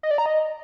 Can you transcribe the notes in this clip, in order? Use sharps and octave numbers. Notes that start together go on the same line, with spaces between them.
D#5
D5
A#5
D#5